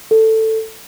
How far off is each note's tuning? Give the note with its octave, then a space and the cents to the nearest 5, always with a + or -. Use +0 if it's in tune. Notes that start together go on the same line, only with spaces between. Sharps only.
A4 +10